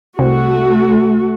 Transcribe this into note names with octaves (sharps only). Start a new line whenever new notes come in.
C2 C3 A3 F#4